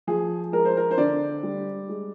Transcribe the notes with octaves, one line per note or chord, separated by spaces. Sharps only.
F3 G#4
G#3 A#4
C5
A#4
C5
D3 D5
G3
G#3